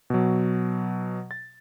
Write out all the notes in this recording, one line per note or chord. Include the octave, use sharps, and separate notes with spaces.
B2 F#3
A6